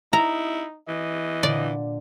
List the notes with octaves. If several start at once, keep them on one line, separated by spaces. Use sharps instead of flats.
D#4 E4 A#5
E3 D#5
A#2 D3 D5